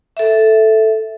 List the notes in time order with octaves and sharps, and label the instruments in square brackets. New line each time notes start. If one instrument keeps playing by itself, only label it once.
[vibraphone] A4 E5